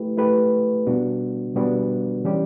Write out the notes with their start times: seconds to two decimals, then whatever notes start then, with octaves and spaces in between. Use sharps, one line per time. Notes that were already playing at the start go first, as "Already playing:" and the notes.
Already playing: A3 E4 G4 B4
0.17 A3 E4 G4 B4
0.87 B2 G3 B3 D4 F#4
1.55 B2 G3 B3 D4 F#4
2.25 E3 G3 C#4 G4 D5